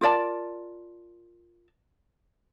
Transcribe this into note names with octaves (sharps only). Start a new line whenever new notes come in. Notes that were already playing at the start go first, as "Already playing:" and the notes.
F4 A#4 D5 A5